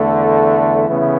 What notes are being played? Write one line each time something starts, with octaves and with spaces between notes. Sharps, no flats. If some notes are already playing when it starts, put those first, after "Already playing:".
Already playing: E2 D3 A3
C#3 E3 B3 E4